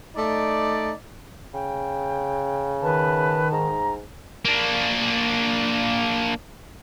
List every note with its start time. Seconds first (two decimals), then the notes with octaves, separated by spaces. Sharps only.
0.15 A3 D#4 D5
1.54 C#3 G5
2.82 D#3 B4 A5
3.52 G#2 A#5
4.45 A#3 D4